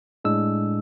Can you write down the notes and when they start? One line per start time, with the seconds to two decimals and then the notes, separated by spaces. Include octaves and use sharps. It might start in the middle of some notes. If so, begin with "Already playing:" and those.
0.25 A2 G#3 D4 E6